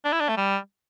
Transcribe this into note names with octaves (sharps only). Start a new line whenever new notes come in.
D4
E4
D4
A3
G3